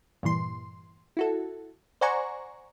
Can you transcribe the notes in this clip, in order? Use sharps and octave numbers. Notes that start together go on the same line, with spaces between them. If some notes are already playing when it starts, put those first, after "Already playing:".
G2 A#2 E3 C6
E4 F#4 A4
C5 D5 F#5 G#5 A#5 C#6